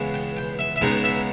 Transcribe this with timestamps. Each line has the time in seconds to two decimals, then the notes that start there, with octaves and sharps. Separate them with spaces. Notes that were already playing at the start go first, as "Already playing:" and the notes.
Already playing: C#2 C#3 E3 G#3 B3
0.14 G5
0.37 G5
0.59 E5
0.76 E5
0.81 C#2 C#3 G#3 B3 D#4 G5
1.04 E5